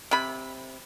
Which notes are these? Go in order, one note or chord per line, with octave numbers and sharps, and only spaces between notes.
C3 B5